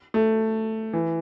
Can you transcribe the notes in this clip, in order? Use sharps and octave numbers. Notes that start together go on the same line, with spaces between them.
A3
E3